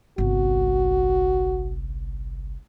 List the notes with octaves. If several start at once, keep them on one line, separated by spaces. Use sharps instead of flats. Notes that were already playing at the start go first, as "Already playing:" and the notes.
G1 C2 F#4